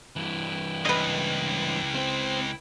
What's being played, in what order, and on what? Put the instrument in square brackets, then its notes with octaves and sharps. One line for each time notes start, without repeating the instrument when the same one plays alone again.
[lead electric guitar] G2 E3 [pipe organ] E4 G5
[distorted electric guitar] C#2 [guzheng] B4 D#5
[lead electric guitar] C4 C5